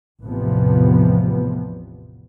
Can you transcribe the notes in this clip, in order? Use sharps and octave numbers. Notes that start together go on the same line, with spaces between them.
A1 E2 G#2 C3 F3 B3